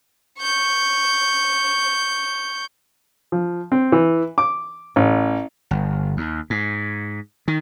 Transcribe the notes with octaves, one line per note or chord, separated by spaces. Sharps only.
C#6 G6
F3
C4
E3
D6
A1
G1
D#2
G#2
D#3